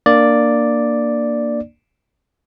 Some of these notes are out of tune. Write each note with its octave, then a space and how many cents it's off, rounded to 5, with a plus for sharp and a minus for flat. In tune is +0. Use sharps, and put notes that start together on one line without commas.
A#3 +0 D4 +20 D5 +0